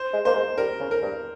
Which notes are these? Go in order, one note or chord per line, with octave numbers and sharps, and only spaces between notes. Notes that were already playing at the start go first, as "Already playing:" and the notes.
Already playing: C5
G#3
A#3 C5
G#3
G3 A#4
C#3
A#4
G2